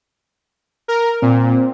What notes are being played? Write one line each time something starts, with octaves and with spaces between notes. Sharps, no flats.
A#4
A#2 C4